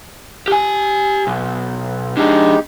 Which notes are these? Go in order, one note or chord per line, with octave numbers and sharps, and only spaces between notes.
G4 G#5
B1
G#3 D4 D#4 G4 G#4